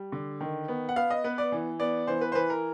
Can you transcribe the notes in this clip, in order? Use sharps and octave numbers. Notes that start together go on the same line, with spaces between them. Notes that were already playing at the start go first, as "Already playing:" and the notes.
Already playing: G3
D3
D#3
B3
F#5
B3 F5
D#5
B3 B4
D5
E3
B3 D5
E3 C5
B4
C5
E3 B4
A#4